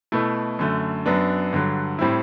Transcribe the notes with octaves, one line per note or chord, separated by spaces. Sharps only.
B2 A3 E4
F#2 D3 A3
F#2 F#3 B3 D4
G2 D3 F#3
A2 G3 C4 E4